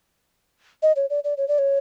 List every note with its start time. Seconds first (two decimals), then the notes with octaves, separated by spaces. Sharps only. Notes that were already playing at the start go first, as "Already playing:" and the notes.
0.83 D#5
0.96 C#5
1.10 D5
1.24 D5
1.37 C#5
1.48 D5
1.58 C#5